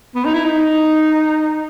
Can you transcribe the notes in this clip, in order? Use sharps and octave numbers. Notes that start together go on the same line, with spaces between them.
B3
D#4
E4
D#4